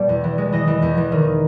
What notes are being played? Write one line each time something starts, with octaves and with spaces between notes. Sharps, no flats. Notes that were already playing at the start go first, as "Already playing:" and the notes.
Already playing: B2 G3 D5
E2
E3
G#3
E3 D#5
E3
E2
E3
D#3